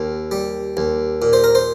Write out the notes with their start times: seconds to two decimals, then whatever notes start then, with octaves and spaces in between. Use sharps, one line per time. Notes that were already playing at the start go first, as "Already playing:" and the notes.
Already playing: D#2 D#3
0.31 G3
0.77 D#2
1.22 A#2
1.33 C5
1.44 A#4
1.55 C5